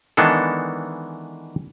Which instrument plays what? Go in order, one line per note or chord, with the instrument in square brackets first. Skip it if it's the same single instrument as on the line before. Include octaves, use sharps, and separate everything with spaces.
[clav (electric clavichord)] D#3 E3 G#3 B3 D4 A4